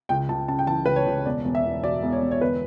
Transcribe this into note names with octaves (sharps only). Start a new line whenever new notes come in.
C#2 G5
C#2 A5
C#3 A5
G5
E3 A5
C#2 B4
C#5
C#2
E1 D5
E1
E5
E2
B2 D5
E1
C#5
E1
C#5
G1 B4